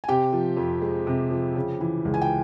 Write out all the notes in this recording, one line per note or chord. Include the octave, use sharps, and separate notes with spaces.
G#5
C3 G4 G5
F3
F2
G#3
C3
F3
C#3
E3
C#2
G#5
G5